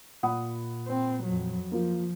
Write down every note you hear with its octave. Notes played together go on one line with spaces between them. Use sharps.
A#2 F#5 B5 D#6
C4
F2 F#3
F3 A#3 F4